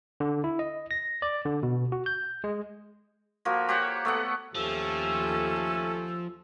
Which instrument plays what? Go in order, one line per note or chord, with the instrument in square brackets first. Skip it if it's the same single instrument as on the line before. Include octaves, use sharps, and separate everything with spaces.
[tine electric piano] D3
E4
D#5
A#6
D5
D3
B2
F#4
G6
G#3
[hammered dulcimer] F3 A#3 F#4
G4 C5 C#5 F#5
A3 B3 F#5
[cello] D#2 G4 [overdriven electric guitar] F3 [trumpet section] A3 C#4 A4 [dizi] E6